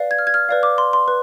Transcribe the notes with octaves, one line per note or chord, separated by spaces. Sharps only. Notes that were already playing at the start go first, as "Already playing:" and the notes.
Already playing: B4 D5 F5
G#6
F6
G#6
F6
B4 D5 F5
D6
C6
C6
B4